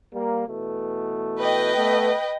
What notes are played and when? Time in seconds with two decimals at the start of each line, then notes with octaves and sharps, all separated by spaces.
0.14 G3 A#3
0.48 B2 E3 A3
1.38 B4 D#5 G5
1.76 A3 B3